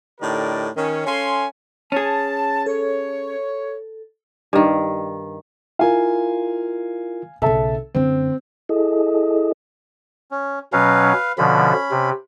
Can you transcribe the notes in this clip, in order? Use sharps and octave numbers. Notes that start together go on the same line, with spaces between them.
A2 D3 D#4 G4 A#4 D5
D#3 C#4
C#4 A4 F5 G#5 C6
C#4 G#4 A5
A4 C#5
G2 D#3
E4 F4 A#4 F5 G#5
B1 C#3 A4 E5 A5
F#2 D3 A3 C4
E4 G#4 A4 D#5
C#4
B2 F#3 C#4 B4 F5
B2 D3 F3 C#4 B5
C3